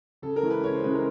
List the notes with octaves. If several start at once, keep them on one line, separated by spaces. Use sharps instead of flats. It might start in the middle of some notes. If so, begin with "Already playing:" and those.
C#3 A4
A#4
E3 G#3 C#4
B4
C#3 C#5
C5
E3 G#3 C#4 B4
A#4